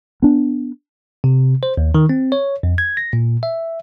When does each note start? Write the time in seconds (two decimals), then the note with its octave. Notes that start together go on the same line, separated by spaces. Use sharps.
0.22 B3 D4
1.24 C3
1.63 C5
1.77 D#2
1.95 D#3
2.09 C4
2.32 C#5
2.63 F2
2.78 G#6
2.97 A#6
3.13 A#2
3.43 E5